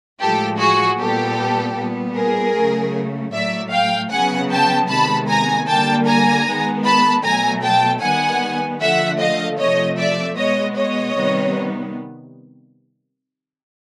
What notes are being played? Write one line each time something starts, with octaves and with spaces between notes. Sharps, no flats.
A2 F3 G#3 G4 A4
F#4 G#4
A#2 G3 B3 G4 A4
A#2 G3 B3
G#4 A#4
C#3 F#3 A3
A2 F#3 A3 D5 E5
F5 G5
C#3 F#3 B3 F#5 G#5
G5 A5
C3 D#3 G#3 B3 A5 B5
G#5 A#5
D3 G3 A#3 G5 A5
G#5 A#5
D#3 G#3 B3
A5 B5
B2 F#3 A3 G#5 A#5
G5 A5
D#3 G3 B3 F#5 G#5
D3 F3 A3 E5 F#5
D#5 F5
C3 F3 A3 C#5 D#5
D5 E5
B2 G#3 B3 C#5 D#5
C#5 D#5
C3 D#3 G3 B3